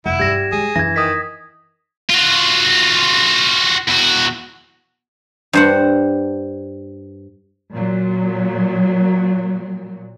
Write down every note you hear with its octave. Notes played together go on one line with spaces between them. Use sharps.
F1 D2 E4 F#5
G2 G3 D4 G#6 A#6 E7
G#3 G#4
F#2 E3 G#6 A#6
D#3 D#6 B6
F4 F#4
E2 F#4
G2 C5 F#5
A#2 F#3